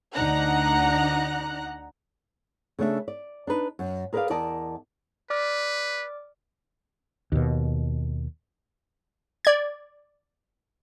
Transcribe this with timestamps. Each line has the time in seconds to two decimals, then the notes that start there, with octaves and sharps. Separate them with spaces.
0.14 D2 D4 D#4 F#5 A#5 F#6
2.79 C#3 A3 D4 E5
3.08 D5
3.47 D4 D#4 B4
3.79 F#2
4.13 G#4 A#4 B4 C#5 D5 F5
4.30 E2 A#4 D5 D#5 A5
5.30 B4 D5 D6 F6
7.32 D#2 B2
9.45 D5 G#6